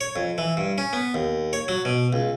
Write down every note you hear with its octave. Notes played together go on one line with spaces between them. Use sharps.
C#5
F2
E3
G2
C#4
B3
D#2
C#5
F#3
B2
C#2